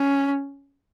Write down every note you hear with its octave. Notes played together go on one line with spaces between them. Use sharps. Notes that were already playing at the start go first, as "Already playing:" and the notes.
Already playing: C#4